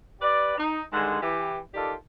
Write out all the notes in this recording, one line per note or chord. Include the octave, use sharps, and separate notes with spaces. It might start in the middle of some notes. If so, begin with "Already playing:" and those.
G4 B4 D5
D#4
G2 D3 D#3 G#3
E3 G4
D#3 F4 G4 A4 D5